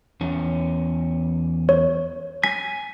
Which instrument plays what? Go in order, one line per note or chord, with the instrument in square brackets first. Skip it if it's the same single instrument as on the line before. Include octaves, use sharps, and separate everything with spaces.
[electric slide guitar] E2 C#4
[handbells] C#5
[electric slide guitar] G#5 [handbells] B6